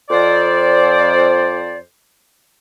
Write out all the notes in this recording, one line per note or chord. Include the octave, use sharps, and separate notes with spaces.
F2 C5 D5